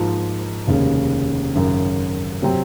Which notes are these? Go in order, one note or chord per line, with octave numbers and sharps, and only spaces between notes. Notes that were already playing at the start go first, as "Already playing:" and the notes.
Already playing: G#2 F3 A#3 F4
F1 D#2 C#3 G#3 C#4
G#1 F#2 C#3
C3 F#3 C4